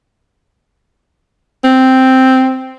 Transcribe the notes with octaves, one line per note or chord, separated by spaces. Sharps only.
C4